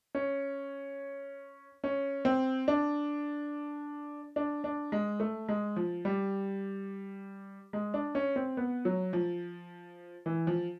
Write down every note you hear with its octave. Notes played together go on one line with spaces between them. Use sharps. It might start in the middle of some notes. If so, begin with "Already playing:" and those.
C#4
C#4
C4
D4
D4
D4
G#3
A3
G#3
F3
G3
G#3
D4
C#4
C4
B3
F#3
F3
E3
F3